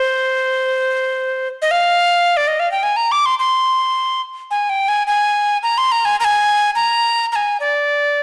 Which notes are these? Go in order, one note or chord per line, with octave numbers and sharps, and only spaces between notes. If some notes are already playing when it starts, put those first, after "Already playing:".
Already playing: C5
D#5
F5
D5
D#5
F5
G5
G#5
A#5
D6
C6
C6
G#5
G5
G#5
G#5
A#5
C6
A#5
G#5
A#5
G#5
A#5
A#5
G#5
D5